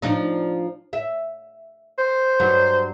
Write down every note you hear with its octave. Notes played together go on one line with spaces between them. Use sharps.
F3 D4 D#4
E5
C5
G2 F#3